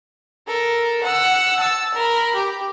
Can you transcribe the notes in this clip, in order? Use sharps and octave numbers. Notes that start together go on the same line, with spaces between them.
A4 A#4
F#5 E6
A5 E6
A#4 B5
G4